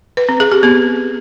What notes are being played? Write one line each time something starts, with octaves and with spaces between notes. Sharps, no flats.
B4
C4
G#4
G4
B3